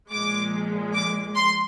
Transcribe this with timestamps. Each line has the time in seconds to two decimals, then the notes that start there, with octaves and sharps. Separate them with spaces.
0.11 A#2 F3 G#3 D6
0.94 D6
1.36 C6